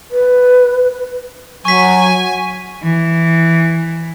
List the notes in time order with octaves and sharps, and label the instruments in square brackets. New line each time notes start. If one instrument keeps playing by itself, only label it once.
[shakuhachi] B4
[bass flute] F#3 [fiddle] G#5 [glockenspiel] C#6 B6
[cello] E3